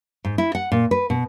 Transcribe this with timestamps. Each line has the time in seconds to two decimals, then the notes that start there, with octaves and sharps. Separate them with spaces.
0.25 G#2
0.38 E4
0.55 F#5
0.72 A#2
0.91 B4
1.10 B2